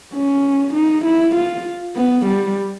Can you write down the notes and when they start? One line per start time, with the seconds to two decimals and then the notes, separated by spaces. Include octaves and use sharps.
0.14 C#4
0.74 D#4
1.05 E4
1.36 F4
1.96 B3
2.26 G3